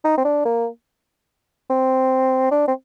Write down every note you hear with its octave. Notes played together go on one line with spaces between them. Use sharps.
D#4
C4
D4
A#3
C4
D4
C4